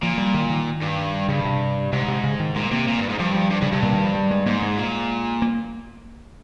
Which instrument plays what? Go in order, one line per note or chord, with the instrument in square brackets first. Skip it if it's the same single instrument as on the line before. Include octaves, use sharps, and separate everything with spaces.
[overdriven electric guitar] A#2 [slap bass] F3
[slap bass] G3
D#3
D#3
[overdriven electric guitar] G2
[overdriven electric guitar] G2 [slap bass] C#3
[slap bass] C3
[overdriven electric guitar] G#2 [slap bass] C3
[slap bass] C3
C#3
D#3
[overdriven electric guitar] A#2 [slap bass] G#3
[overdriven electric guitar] C3 [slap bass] A#3
[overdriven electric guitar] A#2
G2
G#2
[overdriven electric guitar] G2 [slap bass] F3
[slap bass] F3
[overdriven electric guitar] G2
[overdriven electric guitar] G2 [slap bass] C#3
[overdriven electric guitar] G2 [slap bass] C3
[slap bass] A#2
D#3
F3
G3
G#3
[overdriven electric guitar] G#2 [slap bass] A#3
[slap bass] G#3
[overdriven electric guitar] A#2
[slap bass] A#3